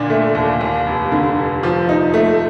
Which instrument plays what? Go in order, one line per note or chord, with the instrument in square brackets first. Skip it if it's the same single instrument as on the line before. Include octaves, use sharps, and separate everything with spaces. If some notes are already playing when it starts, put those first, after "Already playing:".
Already playing: [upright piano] A#2 D3 D4
A3
D#2
D#2
F1
D3
F1
F3
D#4
A3